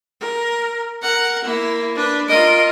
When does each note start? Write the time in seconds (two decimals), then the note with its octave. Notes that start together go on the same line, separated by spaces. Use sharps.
0.21 A#4
1.02 A#4 F#5
1.44 A#3 E4
1.95 D4 B4
2.28 F4 A#4 D#5 D7